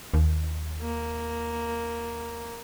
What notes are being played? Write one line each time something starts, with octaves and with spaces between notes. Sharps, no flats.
D#2
A#3